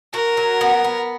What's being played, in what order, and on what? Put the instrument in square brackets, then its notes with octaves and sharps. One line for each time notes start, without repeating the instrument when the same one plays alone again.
[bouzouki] F#4 [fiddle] A#4
[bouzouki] F#3
B3
B3